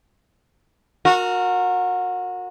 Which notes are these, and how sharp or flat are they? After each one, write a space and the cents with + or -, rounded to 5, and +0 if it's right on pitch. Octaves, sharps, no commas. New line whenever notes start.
F#4 -30 A#4 -10